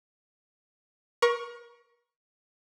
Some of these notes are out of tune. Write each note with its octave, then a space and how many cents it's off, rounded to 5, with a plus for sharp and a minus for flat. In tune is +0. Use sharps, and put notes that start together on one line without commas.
A#4 +35 C#6 +0